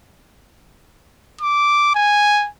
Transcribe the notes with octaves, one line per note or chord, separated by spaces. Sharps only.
D6
G#5